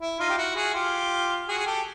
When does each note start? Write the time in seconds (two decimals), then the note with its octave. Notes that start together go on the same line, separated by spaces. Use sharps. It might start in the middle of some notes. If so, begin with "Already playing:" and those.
0.01 E4
0.19 D#4 F4
0.29 G4
0.37 E4 F#4
0.56 F#4 G#4
0.74 F4 G4
1.48 F#4 G#4
1.58 G#4
1.66 G4 A4